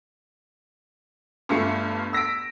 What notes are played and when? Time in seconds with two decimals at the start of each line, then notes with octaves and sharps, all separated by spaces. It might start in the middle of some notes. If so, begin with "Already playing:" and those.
1.49 G1 G2 A3 F4 C#7
2.13 E6 A#6 B6 D7